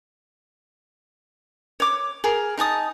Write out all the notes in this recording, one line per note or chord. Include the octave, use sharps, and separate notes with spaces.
C#5 D6
G#4 A#4
D#4 G#5 A5 D#6